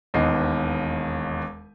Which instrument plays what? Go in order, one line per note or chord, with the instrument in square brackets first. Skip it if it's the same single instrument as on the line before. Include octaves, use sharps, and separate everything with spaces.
[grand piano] E1 D#2 B3 D#5 C7